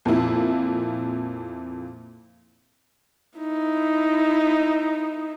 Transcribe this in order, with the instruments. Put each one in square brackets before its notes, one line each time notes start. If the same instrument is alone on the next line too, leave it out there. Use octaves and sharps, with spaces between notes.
[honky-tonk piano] F2 A#2 A#3 E4
[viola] D#4 E4